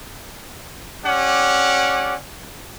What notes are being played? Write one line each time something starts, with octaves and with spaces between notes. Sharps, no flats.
C#4 G4 D5 F#5